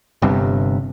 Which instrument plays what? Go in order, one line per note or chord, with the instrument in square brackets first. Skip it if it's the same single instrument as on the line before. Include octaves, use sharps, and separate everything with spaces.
[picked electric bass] G1 G2 C3